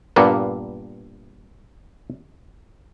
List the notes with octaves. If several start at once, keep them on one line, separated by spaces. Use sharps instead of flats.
G2 A#2 A#3 B3